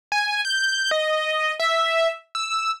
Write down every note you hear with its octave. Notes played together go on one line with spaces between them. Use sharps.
G#5
G6
D#5
E5
E6